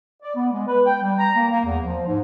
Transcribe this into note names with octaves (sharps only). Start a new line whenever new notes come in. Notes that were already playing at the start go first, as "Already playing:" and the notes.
D5
B3
G#3
B4
G5
G3
A#5
A#3
A#3
E2
F3
G#2